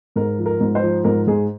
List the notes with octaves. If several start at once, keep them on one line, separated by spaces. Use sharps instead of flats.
G#2 A#4
F3
A#4
G#2
C5
F3
G#2 A#4
G#2 G#4